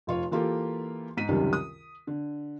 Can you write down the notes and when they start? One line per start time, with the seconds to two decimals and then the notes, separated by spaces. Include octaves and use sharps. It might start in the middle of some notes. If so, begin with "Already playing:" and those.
0.07 F1 F4 C#5
0.31 E3 A#3 F4 G4 A4
1.17 G#2 D#4 B6 D#7
1.29 C#2 F#2 C3 D#3 G3 C#4
1.53 D#6
2.07 D3